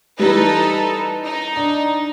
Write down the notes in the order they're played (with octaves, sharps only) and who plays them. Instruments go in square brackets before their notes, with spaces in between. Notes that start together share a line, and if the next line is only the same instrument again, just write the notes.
[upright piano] E3 G3 [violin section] D#4 A4 B4
[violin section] D#4
[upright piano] D4